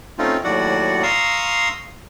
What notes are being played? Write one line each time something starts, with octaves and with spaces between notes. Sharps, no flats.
A3 C4 C#4 D#4 F4
D#2 A2 F#3 F#4 D5 F#5
F5 A#5 C6 C#6 D#6 E6